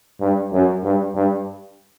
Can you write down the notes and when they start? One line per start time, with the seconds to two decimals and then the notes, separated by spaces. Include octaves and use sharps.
0.20 G2
0.52 F#2
0.83 G2
1.15 G2